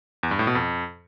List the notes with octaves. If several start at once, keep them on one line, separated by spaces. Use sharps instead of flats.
E2
G2
A2
B2
F2